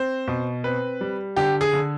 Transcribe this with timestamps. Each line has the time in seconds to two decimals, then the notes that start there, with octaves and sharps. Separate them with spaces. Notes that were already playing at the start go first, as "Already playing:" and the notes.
Already playing: C4 C5
0.28 B2
0.64 C4 B4
1.01 G3
1.36 D3 G4
1.61 G#4
1.73 D3